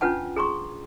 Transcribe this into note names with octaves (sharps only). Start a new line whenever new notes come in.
C#4 D4 F4 B4 F#5 A5
G#4 A#5 C6 C#6